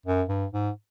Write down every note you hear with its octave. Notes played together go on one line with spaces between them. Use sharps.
F#2
G2
G#2